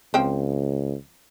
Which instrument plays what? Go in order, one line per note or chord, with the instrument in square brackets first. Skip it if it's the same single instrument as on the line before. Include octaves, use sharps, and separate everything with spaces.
[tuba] C#2 [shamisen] F3 C4 G5